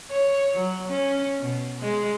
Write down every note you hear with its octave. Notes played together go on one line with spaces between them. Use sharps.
C#5
F#3
C#4
B2
G#3